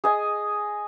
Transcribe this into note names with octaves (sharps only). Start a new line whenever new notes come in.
G#4 D#5 G#5